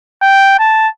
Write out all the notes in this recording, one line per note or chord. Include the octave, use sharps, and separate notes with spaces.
G5
A5